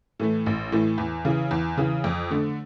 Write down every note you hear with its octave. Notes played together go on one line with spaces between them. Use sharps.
A2 E3 A3
A1
A2 E3 A3
E2
C#3 E3
E2
C#3 E3
F2
D3 A3